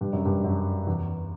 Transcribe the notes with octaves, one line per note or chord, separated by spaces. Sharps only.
G2
F#2
G2
F#2
E2